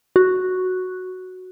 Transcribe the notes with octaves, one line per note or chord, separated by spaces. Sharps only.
F#4